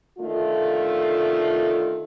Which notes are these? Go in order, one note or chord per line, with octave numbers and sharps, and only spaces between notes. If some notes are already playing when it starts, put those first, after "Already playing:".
D3 D#3 A3 F4